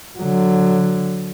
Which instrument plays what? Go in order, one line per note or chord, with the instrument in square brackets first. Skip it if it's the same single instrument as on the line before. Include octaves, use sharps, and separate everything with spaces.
[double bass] D3 F#3